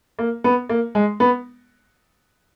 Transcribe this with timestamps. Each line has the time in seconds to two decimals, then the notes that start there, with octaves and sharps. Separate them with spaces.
0.19 A#3
0.44 B3
0.69 A#3
0.95 G#3
1.20 B3